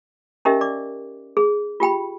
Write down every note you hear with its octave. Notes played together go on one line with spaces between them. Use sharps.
C#4 D#4 G4 A#4 D#5 E5
D5 D6
G#4
F4 G4 G5 B5